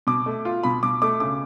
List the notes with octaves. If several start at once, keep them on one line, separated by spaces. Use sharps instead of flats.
B2 D6
A3
F4
B2 B5
B2 D6
A3 D6
C#3 D6